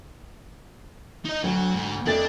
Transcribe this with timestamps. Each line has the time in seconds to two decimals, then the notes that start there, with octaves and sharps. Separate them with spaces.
1.25 D#4 D#5
1.44 D2 F#3
1.75 G#2
2.06 F2 A3 D4 A6